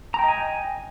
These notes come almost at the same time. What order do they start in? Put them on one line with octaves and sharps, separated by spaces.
A#5 G5 D#5 G#5